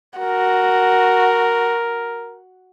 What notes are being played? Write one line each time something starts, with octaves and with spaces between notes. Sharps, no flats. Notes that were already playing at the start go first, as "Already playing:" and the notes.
F#4 A#4